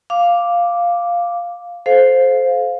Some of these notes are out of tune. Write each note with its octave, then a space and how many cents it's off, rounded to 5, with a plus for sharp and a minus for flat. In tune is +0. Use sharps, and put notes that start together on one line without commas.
F5 +0 D6 +0
A4 -30 C5 +0 F5 +10